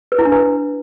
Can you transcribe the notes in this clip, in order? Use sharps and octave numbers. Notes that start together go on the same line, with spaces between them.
B4
E4
D4
B4